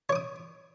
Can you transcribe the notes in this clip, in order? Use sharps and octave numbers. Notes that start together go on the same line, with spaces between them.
C#5 D6 D#6